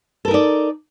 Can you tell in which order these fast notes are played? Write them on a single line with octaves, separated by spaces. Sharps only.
A4 A#4 D#4 D5